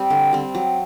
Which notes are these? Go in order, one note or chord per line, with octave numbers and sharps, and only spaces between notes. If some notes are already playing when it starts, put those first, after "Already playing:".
Already playing: G3 C4
D3
G3 C4
F#3